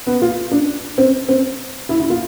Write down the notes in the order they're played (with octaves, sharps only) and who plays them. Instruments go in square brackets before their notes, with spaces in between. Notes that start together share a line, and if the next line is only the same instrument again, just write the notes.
[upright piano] B3
F4
D4
C4
C4
E4
E4
F4